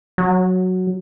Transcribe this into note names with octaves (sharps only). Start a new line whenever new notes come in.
F#3